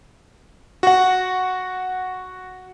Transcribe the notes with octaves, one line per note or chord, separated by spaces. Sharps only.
F#4 F#5